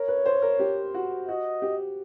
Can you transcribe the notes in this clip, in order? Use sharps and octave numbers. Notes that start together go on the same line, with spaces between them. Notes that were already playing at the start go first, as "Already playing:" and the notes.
Already playing: A#4 C#5
B4
C5
A#4
G4
F#4
F#4 D#5
G4